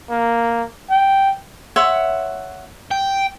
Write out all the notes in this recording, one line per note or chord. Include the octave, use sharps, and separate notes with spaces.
A#3
G5
C#5 E5 F#5 C6
G5